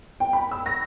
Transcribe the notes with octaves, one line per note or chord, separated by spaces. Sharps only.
G5
B5
E6
A#6